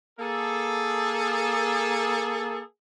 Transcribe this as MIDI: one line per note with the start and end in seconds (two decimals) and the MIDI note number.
0.19 2.60 58
0.19 2.60 68
0.19 2.60 69